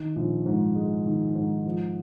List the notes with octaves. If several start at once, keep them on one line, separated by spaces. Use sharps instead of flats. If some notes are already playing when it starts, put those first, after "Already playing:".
Already playing: D#3
A#1
G#2
G#3
D#3
G#2
F3